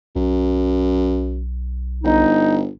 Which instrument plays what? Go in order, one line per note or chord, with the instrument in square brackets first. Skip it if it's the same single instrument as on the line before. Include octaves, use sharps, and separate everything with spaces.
[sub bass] B1 [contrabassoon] F#2
[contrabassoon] G1 [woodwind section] D#4